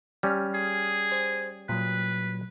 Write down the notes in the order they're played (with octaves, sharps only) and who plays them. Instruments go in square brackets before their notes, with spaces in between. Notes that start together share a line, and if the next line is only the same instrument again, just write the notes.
[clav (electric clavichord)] G3 C#4 [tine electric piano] G4 F6
[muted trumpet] G#4
[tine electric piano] C5
[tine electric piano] A#2 F#3 [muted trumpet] B4